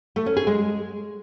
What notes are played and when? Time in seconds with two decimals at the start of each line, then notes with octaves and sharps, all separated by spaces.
0.16 A3
0.26 C#4
0.37 G#4
0.47 G#3